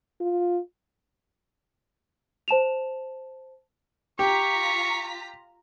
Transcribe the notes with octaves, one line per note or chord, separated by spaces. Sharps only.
F4
C5 A5 E7 F7
F4 G4 A#5 C#6 B6